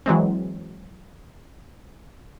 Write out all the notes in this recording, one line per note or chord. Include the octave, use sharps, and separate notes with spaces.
E3 F#3 G#3 C4